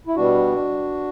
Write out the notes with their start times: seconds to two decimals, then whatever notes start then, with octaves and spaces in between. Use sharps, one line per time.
0.07 E4
0.16 B2 G3 B3 D4 F#4